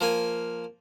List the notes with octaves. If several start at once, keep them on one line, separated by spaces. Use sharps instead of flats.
F3 A#3 G#5